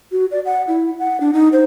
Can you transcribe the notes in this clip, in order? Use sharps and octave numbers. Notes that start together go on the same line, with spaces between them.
F#4
D5
F#5
E4
F#5
D4
D#4
C5